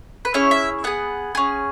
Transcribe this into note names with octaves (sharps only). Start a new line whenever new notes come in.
B4
C#4 E4 G#4 C#5
E5
B3 G#4 F#5
C#4 G#4